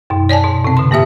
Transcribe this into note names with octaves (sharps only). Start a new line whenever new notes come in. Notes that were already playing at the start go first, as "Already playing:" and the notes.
F#2 B2
C#5 D5 G#5 A5
B2
C3 C4
D3 C6
G#2 A#3 G4 E5 D#6